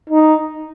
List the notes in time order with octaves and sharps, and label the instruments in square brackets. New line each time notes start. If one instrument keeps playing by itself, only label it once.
[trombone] D#4